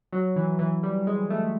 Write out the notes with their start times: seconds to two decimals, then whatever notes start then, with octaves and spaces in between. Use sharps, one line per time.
0.12 F#3
0.36 E3
0.59 E3
0.83 G3
1.07 G#3
1.30 A3